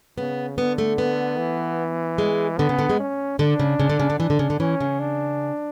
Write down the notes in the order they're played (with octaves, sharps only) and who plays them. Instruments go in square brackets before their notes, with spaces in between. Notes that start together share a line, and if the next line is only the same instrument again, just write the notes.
[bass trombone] C#3 [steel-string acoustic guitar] B3
[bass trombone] D3 [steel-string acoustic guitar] B3
[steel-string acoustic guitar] A3
B3
[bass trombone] E3
[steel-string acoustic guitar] G#3
[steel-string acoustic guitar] D3 [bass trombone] B3
[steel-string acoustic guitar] C#3
D3
G#3
[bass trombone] C#4
[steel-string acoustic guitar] D3 [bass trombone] D4
[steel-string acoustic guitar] C#3
C#3
D3
C#3
D3
[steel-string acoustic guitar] E3 [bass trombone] D4
[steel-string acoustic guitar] D3
C#3
D3
[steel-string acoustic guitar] E3 [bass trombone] C#4
[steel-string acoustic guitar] C#3
[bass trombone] D4